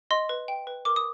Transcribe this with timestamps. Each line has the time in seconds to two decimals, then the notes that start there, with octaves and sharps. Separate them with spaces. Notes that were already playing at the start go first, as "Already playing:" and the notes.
0.11 D#5 C6
0.29 B4
0.48 G5
0.67 B4
0.85 A#4 D6
0.96 D#6